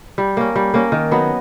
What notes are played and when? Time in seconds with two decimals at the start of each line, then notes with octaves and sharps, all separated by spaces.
0.18 G3
0.37 A#3 C#4
0.56 G3
0.74 A#3 C#4
0.92 D#3
1.11 F#3 B3 D#4